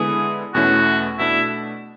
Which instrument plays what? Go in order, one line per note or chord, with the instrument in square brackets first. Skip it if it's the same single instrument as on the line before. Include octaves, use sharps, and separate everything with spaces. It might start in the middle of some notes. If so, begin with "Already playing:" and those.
Already playing: [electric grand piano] D3 G#3 B3 E4 [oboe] G#4
[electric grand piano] E2 B2 A3 C#4 E4 [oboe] F#4
[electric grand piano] B2 A3 D4 [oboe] E4